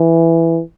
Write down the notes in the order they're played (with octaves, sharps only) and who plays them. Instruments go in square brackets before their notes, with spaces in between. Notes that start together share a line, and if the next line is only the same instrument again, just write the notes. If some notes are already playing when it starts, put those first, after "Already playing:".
Already playing: [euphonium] E3